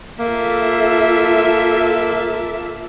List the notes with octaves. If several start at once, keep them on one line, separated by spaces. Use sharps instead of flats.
A#3 F4 A4 E5